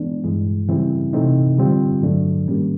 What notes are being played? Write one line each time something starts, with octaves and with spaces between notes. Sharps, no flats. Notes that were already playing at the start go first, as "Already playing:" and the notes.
Already playing: E3 G#3 B3 D4
G2 E3 G#3
C#3 E3 G3 C4 E4
C3 E3 A3 C4 D#4
D3 G3 C4 F4
G2 D3 F#3 A3 D4
G#2 D#3 G3 A#3 C#4